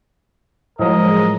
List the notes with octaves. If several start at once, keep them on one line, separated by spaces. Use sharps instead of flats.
A2 F3 F#3 G#3 A#4 D#5